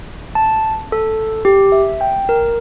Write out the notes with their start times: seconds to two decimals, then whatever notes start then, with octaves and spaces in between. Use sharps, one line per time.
0.35 A5
0.92 A4
1.45 G4
1.72 E5
2.01 G5
2.29 A#4